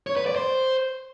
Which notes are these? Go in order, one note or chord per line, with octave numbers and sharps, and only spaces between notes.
C#5
B4
D5
C5